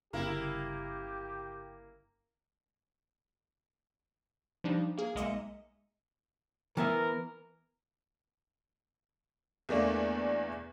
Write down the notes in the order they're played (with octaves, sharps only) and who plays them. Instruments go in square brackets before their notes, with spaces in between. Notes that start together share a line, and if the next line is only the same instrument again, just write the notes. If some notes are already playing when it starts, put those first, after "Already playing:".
[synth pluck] G1 C#3 [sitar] A#3 E4 A#4 [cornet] G4
[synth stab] F3 G3 D4 D#4
A#3 G#4
B1 G#3 A#3 D#5 E5 C#7
[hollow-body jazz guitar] E3 B3 E5 [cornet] A#4
[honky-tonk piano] E2 A3 A#3 D4